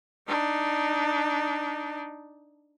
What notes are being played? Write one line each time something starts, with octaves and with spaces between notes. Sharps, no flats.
D4 D#4